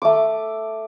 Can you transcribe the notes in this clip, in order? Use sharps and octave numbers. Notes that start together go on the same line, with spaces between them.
A3 D6